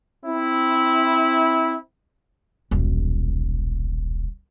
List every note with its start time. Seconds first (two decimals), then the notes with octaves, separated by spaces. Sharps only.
0.25 C4 E4
2.71 D#1 B1